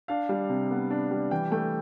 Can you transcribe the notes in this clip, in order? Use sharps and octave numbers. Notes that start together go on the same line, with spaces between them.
D4 F5
G3
C3
B3
D4
G3
E3 G5
A3 G5